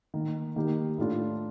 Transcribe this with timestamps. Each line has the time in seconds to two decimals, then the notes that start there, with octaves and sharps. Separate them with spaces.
0.14 D#3 A#3 D#4
0.56 D#3 A#3 D#4 G4
0.98 A2 A3 D4 F4